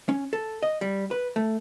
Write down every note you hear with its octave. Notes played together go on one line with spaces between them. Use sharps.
C#4
A4
D#5
G3
B4
A3